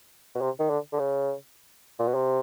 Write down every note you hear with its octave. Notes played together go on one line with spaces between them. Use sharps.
B2
C3
D#3
D3
D3
C#3
A#2
B2
C3